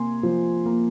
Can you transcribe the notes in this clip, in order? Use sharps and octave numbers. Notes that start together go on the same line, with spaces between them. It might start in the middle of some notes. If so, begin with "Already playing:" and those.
Already playing: C3 A#3 G#5 C6
F3
A#3